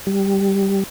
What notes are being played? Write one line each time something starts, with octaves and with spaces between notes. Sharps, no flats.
G3